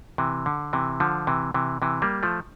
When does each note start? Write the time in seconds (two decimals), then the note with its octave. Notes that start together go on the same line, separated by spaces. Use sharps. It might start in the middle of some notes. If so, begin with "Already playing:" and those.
0.18 C3 E3
0.46 D3
0.73 C3 E3
1.00 D3 F3
1.27 C3 E3
1.54 C3 E3
1.82 C3 E3
2.02 G3 A#3
2.23 F3 A3